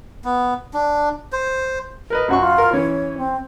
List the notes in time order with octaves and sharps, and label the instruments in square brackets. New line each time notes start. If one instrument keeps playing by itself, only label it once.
[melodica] B3
D4
C5
[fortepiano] A#4 B4 D#5
[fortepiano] F#2 F#4 C#6 [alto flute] C#4
[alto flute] F4
[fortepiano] A#4
[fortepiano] E3 C#4 [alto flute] C#5
[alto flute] C4